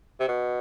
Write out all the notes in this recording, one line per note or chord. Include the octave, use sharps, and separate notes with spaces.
C3
B2